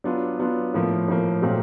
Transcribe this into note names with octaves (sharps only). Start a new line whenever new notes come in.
F#3 B3 D4 F4
F#3 B3 D4 F4
A2 F3 A#3
A2 F3 A#3
A#2 F#3 A3 C4